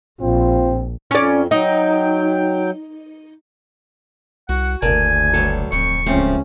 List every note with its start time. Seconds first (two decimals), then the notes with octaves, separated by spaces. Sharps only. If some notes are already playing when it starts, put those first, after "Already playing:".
0.21 A#1 C4 F4
1.11 F2 C#4 D5
1.51 F#3 D#4 G5
4.49 C2 F#4 F#5
4.82 F#1 D2 A#4 D5 G#5 A5
5.34 G2 F#3 A4
5.72 D1 F2 C#6
6.06 C#2 F3 A3 C4 C#4